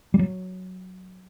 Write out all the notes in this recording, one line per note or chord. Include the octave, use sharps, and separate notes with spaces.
G3
F#3